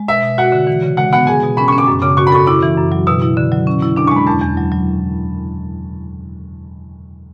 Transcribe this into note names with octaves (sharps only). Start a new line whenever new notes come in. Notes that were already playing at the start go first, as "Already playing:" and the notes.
Already playing: G#3
B2 E5
B2
F#4 F#5
D3
E3
C#3
G#3 F#5
B3 F#5
G#4 G#5
B2
C#4 B5
C#6
C#4
D6
F#2
C#3 D6
F#4 C#6
B5
A4 C#6
E4 D6
E3
F#2
F#3
B2 E6
E4
D3
F#3
C#4
E4
D4 D6
C#6
G#3 B5
E2 A5
E2
F#3
F#3